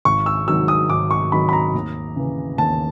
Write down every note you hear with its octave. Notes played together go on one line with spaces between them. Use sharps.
G#1 C#6
E6
G#2 D#3 F#3 E6
D#6
G#1 D6
C#6
G#2 D#3 F#3 B5
B5
A#5
D#2
C#3 E3
D#2 A5